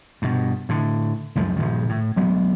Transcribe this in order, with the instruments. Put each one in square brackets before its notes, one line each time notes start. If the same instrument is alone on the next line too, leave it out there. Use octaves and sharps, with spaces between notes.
[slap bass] G2 B2
A2 D3
C#2 F#2 F3 G#3
A#1 G2 D#3
A2
D2 F#3 G#3 B3